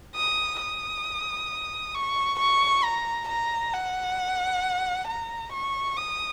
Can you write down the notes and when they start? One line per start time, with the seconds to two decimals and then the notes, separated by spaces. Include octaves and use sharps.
0.16 D#6
0.60 D#6
1.95 C#6
2.39 C#6
2.84 A#5
3.29 A#5
3.74 F#5
5.07 A#5
5.52 C#6
5.97 D#6